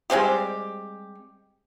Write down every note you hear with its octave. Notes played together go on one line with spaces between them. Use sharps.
G3 G#3 C4 G4